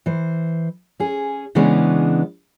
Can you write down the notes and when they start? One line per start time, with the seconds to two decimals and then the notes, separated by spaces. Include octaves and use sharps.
0.06 E3 C5
1.00 C#4 G#4
1.55 C#3 E3 G#3 B3 C#4 D4